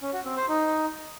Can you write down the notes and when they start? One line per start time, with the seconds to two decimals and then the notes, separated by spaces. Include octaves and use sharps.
0.01 C#4
0.13 F#4
0.25 C4
0.37 C5
0.48 D#4